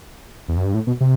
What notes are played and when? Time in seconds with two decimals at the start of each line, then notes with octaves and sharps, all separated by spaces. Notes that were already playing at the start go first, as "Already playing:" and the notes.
0.48 E2
0.57 F#2
0.65 G2
0.74 A2
0.87 B2
1.01 C3